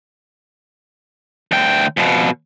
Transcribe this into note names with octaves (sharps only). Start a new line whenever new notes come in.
D2 G5
F2 B2